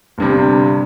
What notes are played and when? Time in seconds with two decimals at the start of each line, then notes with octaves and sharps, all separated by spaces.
0.18 G1 G2 C3